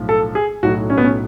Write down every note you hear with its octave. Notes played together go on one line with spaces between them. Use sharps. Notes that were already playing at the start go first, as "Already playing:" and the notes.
Already playing: B1 A2 F3
A4
G#4
B1 A2 F#3 F#4
C#4
B3
C#4